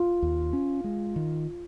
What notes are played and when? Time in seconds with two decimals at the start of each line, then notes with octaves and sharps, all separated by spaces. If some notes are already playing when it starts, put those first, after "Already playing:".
Already playing: F4
0.22 D#2
0.53 C#4
0.84 G#3
1.16 D#3